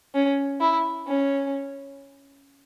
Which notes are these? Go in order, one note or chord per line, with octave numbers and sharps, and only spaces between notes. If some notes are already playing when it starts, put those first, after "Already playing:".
C#4
E4
C#4